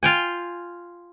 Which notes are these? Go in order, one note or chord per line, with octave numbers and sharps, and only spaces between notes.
F4 G5 G#5